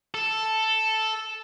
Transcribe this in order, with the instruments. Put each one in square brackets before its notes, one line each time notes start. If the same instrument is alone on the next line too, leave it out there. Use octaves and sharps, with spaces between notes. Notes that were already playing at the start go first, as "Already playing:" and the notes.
[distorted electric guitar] A4